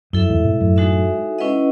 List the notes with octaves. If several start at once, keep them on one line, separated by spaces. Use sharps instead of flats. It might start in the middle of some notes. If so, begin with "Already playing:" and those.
F#2 E4 A4 E5
E2 G#2
G#2 B2
F#2 A2
G#3 D#4 F#4 A4 E5
C#4 E4 B4 D#5 F#5